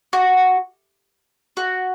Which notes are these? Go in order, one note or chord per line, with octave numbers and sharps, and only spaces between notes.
F#4
F#4